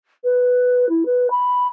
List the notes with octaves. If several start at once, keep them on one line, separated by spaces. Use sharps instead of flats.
B4
E4
B4
B5